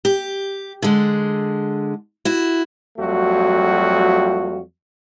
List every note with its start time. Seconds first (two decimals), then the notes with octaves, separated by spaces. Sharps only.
0.05 G4
0.82 D3 G#3
2.25 E4 F#4
2.98 F2 F#3 G3 A3 F4 F#4